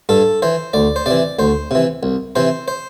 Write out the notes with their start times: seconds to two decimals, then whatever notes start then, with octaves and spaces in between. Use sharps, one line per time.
0.09 G2 A4
0.42 E3 C5
0.73 D2 D5
0.96 C5
1.06 C3 E3 D5
1.39 D2 C5
1.71 C3 E3
2.03 C2
2.36 C3 E3 C5
2.68 C5